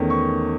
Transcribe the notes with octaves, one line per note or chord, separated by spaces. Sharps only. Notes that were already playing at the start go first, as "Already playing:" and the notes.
Already playing: E2 D#3 A3 C#4
C#6